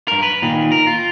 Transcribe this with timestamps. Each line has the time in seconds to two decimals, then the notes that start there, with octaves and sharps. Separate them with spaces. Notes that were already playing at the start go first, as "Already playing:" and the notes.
0.08 G2 A#4
0.23 B4
0.42 A#2 D#3
0.72 A#4
0.87 F4